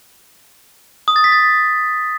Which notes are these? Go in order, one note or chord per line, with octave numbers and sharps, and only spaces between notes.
D#6
A6
B6
A6